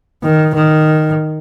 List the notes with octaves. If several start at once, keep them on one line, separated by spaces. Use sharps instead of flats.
D#3
D#3